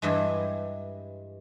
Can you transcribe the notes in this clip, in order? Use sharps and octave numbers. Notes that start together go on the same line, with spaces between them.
G2 E3 G#3